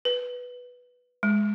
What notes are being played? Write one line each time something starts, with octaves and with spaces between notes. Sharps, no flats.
B4
G#3